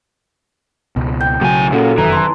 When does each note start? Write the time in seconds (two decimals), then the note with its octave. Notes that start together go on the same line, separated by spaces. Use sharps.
0.96 C#2 B2
1.21 G5 G6
1.41 B1 A2 C#3 F#3 G#5
1.72 F#2 A#2 C#3 F#4 A4
1.98 F1 F#2 D#3 E3 A#5
2.13 A5 C6